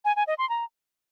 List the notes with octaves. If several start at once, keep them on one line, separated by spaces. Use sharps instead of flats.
G#5
G#5
D#5
C6
A#5